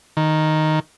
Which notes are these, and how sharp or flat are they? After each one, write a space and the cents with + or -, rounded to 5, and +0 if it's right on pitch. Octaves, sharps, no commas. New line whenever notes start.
D#3 +0